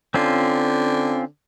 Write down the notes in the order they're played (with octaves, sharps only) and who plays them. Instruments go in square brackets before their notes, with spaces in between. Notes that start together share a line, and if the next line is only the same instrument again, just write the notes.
[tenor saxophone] D3 [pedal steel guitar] C4 C#4 F4